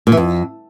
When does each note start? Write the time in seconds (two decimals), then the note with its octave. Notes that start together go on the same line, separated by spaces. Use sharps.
0.07 A#2
0.12 E3
0.17 F2